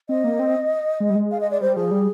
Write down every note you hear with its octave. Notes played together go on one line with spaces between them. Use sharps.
C4 D#5
A#3
C4
G#3
G3
G#3
F5
D#5
D5
G3 C5
F3 G#4
G3